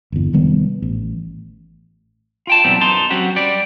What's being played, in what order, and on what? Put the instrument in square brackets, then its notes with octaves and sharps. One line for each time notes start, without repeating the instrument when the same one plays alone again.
[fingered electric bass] G1 E2
F1 D#3 G3 B3
A1
[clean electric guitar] F4 G5 A5
B2 E3 F#3 G3 C4
F#2 D#4 A5 C6
F#3 C4 C#4 F#4 G4
G3 D5